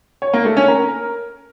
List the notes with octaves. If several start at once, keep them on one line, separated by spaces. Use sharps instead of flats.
C#5
A#3
A3
C#4
A#4